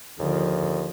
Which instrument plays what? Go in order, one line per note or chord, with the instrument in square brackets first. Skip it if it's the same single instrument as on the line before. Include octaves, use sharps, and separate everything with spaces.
[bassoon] D#2 [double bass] D3 F3